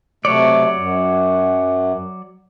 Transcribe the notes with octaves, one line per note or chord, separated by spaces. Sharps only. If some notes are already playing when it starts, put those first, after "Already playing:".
C3 F#3 A3 C#5 D5
F#2